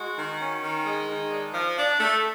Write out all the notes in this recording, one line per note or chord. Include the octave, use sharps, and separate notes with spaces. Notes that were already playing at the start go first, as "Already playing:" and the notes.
Already playing: G#3 F#4
D#3
C#4
D#3
G#3
D#3
D4
F3
D4
A3